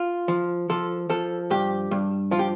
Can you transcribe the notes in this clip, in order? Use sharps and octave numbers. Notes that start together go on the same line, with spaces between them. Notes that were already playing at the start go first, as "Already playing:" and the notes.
Already playing: F4
F3
F3 A4
F3 A4
G2 G4
G2
F3 F4
G4